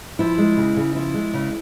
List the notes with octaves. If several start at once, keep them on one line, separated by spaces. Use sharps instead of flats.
F3 E4
G#3
C#3
C#3
F3 E4
G#3
C#3